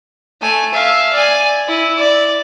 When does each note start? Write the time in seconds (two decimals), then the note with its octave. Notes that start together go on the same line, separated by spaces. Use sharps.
0.41 A3 G#5
0.73 E5 F5
1.12 D5 G#5
1.68 E4
1.97 D5